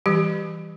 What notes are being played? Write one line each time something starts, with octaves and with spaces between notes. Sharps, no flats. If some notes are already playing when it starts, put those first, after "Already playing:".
E3 G3 G4